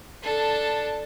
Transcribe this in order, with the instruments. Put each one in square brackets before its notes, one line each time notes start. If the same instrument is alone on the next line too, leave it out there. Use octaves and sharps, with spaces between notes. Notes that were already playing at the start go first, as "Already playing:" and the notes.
[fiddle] D4 A4